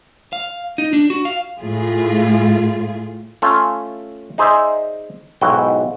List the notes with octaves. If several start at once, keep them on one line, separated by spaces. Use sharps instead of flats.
F5
D#4
D4
F#4
F5
A2 A3 F4 G#4
A3 C#4 F4 A4 G#5
D#4 G#4 C5 D5 E5
B1 G#2 E4 F#4 G5